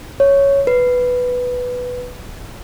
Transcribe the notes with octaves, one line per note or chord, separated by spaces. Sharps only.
C#5
B4